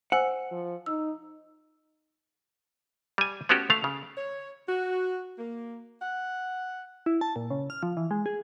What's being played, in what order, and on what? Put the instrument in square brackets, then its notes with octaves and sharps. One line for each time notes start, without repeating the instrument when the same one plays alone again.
[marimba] C5 G#5 E6 [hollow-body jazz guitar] F#5
[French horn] F3
[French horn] D#4 [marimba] E6
[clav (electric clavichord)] G3 G#5
A3 B3 C#4 F#4 G4
A3 F5
C#3
[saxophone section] C#5
F#4
A#3
F#5
[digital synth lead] E4
A5
A#2
C#3
F6
F3
E3
G#3
G#4